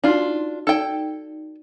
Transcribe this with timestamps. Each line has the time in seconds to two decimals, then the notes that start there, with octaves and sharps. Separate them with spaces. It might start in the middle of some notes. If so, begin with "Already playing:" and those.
0.04 D4 D#4 F4 F#4
0.67 D#4 A4 D5 G5